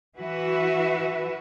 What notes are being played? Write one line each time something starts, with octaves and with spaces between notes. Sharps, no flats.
E3 F#4 B4 E5